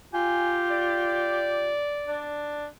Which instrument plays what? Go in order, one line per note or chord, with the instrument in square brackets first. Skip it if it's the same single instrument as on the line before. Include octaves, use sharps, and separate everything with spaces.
[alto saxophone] F4 [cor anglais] G4 [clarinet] G#5
[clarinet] D5
[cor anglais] D4